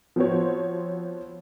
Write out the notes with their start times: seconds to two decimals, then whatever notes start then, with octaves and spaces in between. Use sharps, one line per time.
0.16 F3 B3 C4 F#4 C5 C#5